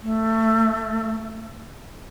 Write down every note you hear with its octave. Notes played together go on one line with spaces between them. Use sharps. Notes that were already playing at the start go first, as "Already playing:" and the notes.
A3